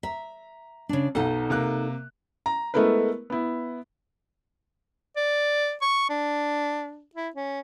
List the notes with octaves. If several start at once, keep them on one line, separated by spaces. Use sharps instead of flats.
E5 A#5
C#3 D4
B1 B2 D#4 A4 F#5
C3 A#3 F#6
A#5
G#3 A3 B3 E4 A#4 B4
B3 E4
D5
C#6
D4
E4
C#4